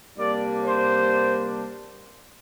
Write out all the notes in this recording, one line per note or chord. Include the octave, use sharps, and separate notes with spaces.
C3 G3 A#3 D4 D5
C5